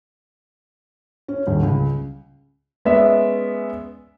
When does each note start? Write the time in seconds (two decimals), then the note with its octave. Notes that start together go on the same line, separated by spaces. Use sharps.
1.28 C#4
1.47 D#1
1.63 C#2
2.85 G#3 B3 C#4 D5 E5